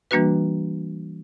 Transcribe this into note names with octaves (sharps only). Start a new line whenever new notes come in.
E3 G3 A#3 D4 F#4 B4